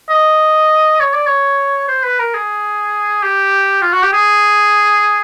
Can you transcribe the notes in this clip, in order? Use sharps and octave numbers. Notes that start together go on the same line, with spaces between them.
D#5
C#5
D5
C#5
C5
B4
A#4
G#4
G4
F4
F#4
G4
G#4